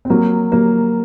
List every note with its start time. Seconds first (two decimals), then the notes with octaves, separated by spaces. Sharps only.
0.05 C4
0.10 F#3 A#3
0.52 F#3 A#3